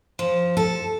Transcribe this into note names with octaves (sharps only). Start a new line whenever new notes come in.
F3
A4